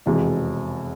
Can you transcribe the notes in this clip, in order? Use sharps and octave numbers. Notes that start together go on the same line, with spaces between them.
F1 E2 B2 G#3